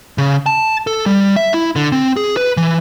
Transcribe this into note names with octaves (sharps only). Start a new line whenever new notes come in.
C#3
A5
A4
G3
E5
E4
D3
C4
G#4
B4
E3